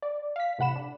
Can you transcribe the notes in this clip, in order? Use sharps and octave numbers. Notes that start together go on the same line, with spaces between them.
D5
F5 B6
A2 C3 F#5 B5 E7
D4